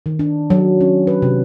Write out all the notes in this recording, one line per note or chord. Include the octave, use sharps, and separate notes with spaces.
D#3
D4
F#3
C#4
B4
C3